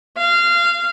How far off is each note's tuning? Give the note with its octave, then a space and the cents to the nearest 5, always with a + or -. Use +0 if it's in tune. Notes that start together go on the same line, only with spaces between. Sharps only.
F5 -20